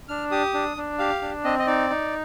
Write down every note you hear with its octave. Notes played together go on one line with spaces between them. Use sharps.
D4 F6
G4 D#6
D4
D4
G4 F5
D4
C4 D#5
D#5
D#4 D5
D#4